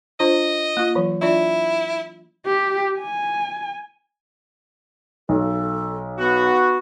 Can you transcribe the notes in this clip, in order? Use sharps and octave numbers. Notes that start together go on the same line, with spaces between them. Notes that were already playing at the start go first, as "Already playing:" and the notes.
D4 F4 C5 D#5
A#3 F4
E3 F#3
D4 E4 F4 D5
G4
G#5
B1 A4
B3 F#4